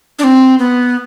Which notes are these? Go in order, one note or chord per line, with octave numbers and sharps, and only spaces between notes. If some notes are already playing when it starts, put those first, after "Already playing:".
D4
C4
B3